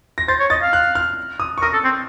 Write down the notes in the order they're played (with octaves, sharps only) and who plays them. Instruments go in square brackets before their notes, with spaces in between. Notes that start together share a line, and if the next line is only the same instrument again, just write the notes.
[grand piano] A#6
[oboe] C5 [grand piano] A6
[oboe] C#5
[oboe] D#5 [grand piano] A6
[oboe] F5
[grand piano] F#6
F6
D#6
C#6
[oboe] A#4 [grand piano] D#6
[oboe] A4
C4